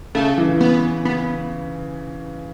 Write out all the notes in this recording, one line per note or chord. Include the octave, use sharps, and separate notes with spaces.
C#3 A3
E3
B3
B3